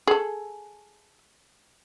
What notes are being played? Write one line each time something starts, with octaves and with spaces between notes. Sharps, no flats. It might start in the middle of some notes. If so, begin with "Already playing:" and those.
G#4 A4